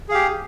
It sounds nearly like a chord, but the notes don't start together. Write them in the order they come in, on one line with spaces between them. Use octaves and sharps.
G#4 F5 G4